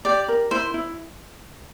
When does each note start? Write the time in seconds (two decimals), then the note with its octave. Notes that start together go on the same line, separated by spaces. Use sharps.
0.05 G4 D5
0.28 A#4
0.51 E4 C5
0.74 E4